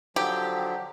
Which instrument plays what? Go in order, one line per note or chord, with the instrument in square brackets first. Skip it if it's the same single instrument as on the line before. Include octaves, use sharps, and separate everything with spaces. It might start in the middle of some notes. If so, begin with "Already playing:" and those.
[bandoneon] D3 F3 F#3 [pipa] G4